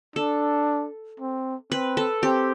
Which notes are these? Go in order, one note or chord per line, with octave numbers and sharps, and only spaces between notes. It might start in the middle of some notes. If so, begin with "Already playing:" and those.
D4 A4
C4
C4 B4
A4
C4 G4